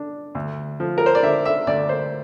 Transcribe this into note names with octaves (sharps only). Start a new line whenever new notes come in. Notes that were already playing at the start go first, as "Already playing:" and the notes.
Already playing: D4
D2
F3
A#4
C5
D5
D3 E5
E5
D2 D5
C5